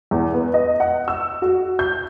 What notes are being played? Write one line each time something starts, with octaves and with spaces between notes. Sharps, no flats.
E2
B3
D#5
F#5
E6
F#4
G6